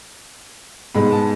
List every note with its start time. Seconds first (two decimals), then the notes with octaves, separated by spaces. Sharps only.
0.94 G#2 G#3 B3 B5
1.12 A5